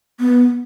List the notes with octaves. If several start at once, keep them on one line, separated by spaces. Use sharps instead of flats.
B3